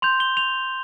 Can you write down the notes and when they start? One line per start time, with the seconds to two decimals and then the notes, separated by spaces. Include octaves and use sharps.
0.02 C6 G6 F7
0.20 G7
0.37 F7